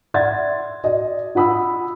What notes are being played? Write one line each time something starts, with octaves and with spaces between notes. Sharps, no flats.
D5 E5 F#5 C6 G#6 A6
F#4 D5 D#5
F4 F#5 B5 D#6 E6